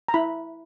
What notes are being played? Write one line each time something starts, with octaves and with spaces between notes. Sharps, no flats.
A#5
E4 B5